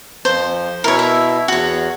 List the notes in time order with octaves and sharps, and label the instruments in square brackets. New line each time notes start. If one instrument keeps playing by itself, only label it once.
[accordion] F2 F3 [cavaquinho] C5
[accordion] B2 E4 [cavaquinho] A#4 C#5
[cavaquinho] E5
[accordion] E2 [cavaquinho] F#4 C#5